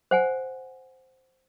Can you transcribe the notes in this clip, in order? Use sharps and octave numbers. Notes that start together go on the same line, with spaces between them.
C5 F#5 G#5